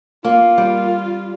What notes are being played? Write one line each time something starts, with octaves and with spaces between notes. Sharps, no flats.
A#3 F4
G3